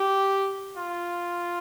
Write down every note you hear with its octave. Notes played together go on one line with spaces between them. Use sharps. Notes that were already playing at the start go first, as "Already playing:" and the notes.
Already playing: G4
F4